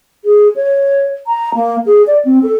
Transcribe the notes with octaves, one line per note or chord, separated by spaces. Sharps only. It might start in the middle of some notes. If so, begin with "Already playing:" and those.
G#4
C#5
A#5
A#3
G#4
D5
C4
A4